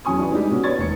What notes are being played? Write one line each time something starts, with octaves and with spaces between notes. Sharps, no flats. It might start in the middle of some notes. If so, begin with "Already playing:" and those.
E2 F#3 C#4 G#5 C#6 D#6
D4 E4 G#4 B4
G3 G#3 D4 D#4 G4
B2 C#4 D#4 F#4
B4 C#5 D5 C#6 G#6 A6
E1 D#2 C#7